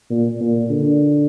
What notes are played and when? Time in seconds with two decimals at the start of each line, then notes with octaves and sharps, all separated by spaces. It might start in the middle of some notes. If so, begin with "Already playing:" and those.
0.10 A#2
0.40 A#2
0.70 D3